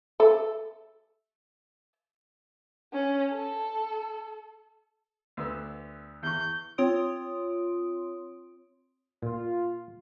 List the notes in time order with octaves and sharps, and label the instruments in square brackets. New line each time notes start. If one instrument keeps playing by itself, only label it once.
[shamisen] A4 E5
[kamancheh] C#4
A4
[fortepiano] D2 B3 E6
[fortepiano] E2 C#6 [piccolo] G6
[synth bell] C4 F4 C#5 C6 D#6 D7
[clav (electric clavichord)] A#2 [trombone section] F4